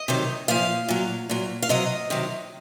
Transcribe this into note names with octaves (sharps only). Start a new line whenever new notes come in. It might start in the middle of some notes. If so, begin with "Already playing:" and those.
Already playing: D#5
C3 D#3 F#3
A#2 F3 F5
A#2 F#3
A#2 F#3
F5
C3 F#3 D#5
C3 D#3 F#3